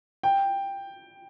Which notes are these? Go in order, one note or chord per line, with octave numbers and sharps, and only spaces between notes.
G5